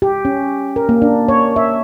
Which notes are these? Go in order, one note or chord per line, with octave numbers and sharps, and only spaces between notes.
G4
C#4
A#4
A#3
D4
C#5
E5